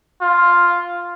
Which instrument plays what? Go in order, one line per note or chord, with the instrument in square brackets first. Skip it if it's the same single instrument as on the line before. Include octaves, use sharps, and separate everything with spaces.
[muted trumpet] F4